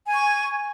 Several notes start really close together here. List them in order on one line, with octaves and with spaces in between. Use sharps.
G#5 G#6 C#6